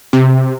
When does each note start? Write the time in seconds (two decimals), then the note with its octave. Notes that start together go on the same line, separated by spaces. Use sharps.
0.13 C3